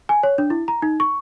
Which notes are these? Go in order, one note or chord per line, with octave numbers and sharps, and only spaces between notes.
G#5
C#5
D4
E4
A#5
D#4
C#6